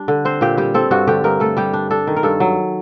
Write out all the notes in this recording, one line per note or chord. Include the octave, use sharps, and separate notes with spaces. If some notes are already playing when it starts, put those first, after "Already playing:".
Already playing: G3 D4
D3
C4 C5
A#2 G4
G3 G4
C4 A4
G2 F#4
D3 G4
G2 A#4
A3 A4
G3 G4
D4
D4 A4
D#3
A#4
G2 A4
F#3